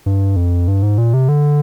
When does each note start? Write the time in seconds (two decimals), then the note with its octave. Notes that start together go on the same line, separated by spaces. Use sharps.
0.06 G2
0.36 F2
0.68 G2
0.83 G#2
0.98 A#2
1.14 C3
1.29 D3